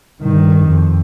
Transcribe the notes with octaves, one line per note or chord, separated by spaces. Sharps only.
G2 D#3
F2